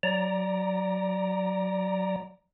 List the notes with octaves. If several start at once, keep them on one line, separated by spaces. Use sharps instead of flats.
F#3 D5 A#5